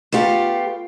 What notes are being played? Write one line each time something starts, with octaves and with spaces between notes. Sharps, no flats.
A3 B3 F4 G4